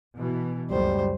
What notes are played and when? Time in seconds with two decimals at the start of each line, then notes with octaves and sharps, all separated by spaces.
0.18 B2 E3
0.70 C#2 F#2 G3 A3 C5